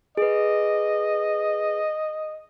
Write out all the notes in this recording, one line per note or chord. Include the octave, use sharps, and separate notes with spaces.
G#4 B4 D#5